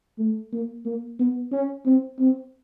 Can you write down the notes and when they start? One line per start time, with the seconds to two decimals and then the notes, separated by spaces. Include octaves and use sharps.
0.19 A3
0.52 A#3
0.85 A#3
1.19 B3
1.52 C#4
1.86 C4
2.19 C4